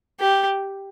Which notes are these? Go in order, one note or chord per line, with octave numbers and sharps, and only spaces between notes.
G4